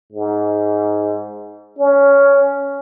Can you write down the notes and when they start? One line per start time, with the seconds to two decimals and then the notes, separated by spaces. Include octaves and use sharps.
0.12 G#2
1.79 C#4